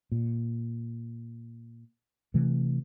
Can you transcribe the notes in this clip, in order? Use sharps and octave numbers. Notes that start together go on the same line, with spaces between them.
A#2
C3 E3 A3